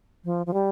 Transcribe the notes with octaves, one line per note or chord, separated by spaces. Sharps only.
F3
F3
G3